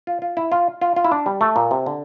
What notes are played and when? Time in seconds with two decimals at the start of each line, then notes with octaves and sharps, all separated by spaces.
0.07 F4
0.22 F4
0.37 E4
0.52 F4
0.82 F4
0.96 F4
1.05 E4
1.12 D4
1.26 G3
1.41 A3
1.56 A#2
1.71 C3
1.86 D3